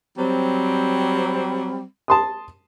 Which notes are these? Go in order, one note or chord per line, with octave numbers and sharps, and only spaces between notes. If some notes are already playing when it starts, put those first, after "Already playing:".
F#3 G3 C4
A5 C6 D#6